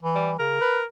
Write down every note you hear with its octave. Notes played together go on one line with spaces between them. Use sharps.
E3
G3
C#3 A#4
B4